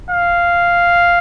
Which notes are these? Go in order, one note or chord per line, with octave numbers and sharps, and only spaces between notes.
F5